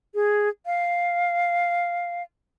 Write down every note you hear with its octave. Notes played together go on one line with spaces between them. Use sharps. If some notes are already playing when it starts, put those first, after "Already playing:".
G#4
F5